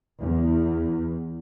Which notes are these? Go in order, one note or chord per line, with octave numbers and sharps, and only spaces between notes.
E2